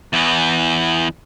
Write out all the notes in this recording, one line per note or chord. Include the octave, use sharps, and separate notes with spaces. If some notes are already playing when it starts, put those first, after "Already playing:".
E2 E3